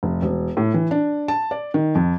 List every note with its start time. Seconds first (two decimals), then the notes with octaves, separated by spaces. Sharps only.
0.03 F1
0.22 E1
0.57 A2
0.74 E3
0.91 D4
1.28 A5
1.51 D5
1.74 D#3
1.95 F2